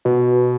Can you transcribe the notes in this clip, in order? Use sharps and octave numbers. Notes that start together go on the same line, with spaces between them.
B2